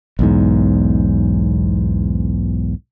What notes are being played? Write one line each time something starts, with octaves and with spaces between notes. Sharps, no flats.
B1 E2 G#2